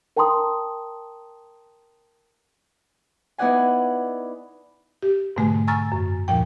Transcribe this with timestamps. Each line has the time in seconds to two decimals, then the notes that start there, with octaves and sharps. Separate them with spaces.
0.16 A#4 G5 A5 A#5 C6 D#6
3.38 B3 D#4 E4 D5 F#5 G#5
5.02 G4
5.36 G#2 B2 D3 A3 G#5
5.67 G#5 A#5 C#6 E6 F6 A6
5.92 F#2
6.28 D#2 A#2 F3 G5